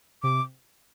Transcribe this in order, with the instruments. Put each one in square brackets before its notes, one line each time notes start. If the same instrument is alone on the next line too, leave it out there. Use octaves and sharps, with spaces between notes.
[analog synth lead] C3 [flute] D6